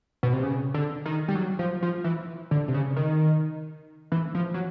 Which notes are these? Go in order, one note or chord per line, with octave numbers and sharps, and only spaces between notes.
B2
C3
C#3
D3
D#3
G3
F#3
F3
F3
E3
D3
C3
C#3
D#3
E3
F3
F#3